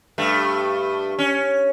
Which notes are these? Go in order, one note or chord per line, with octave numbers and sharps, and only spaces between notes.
G2 A3
C#4